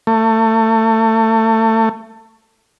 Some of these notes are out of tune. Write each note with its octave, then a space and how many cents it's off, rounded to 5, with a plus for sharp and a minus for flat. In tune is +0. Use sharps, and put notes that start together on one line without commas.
A3 +25